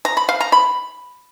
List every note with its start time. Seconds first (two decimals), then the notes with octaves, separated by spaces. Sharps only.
0.05 A#5
0.17 B5
0.29 F5
0.40 A#5
0.52 B5